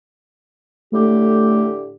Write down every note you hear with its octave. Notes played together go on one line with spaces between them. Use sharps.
A2 D3 A3 G4